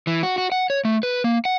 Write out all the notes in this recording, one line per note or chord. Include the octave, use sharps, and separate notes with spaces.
E3
F#4
F#4
F#5
C#5
A3
B4
A#3
F#5